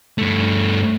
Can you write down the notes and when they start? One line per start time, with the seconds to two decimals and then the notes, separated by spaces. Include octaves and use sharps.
0.18 G2 A3